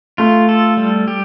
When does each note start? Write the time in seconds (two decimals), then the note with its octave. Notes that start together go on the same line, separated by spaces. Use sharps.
0.18 A3 F4
0.49 A4
0.77 G3
1.08 G4